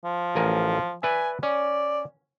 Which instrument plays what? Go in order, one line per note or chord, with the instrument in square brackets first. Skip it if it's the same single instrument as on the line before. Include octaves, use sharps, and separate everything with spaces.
[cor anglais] F3
[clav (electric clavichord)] A1 A#4 G#5
[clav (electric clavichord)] B4 D5 E5 [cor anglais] G#5
[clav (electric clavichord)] C#4 [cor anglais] D5